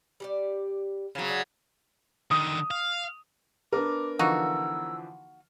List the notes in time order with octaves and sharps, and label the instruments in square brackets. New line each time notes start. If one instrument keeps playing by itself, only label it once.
[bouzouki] G3 G4 D5
[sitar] C#3 F#3 [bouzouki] C4 F4
[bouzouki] G#3 D5 A5
[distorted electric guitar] D3 D#3 [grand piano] D#6
[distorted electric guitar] F5
[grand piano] B3 D4 A#4 [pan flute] D6
[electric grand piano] D3 E3 F3 [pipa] A#3 D#4 F#4 [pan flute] E6